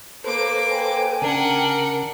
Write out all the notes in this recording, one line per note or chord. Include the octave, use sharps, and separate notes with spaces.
A#3 A4 B4 C5 D6
G5 G#5
C#3 D4 A#4 F#5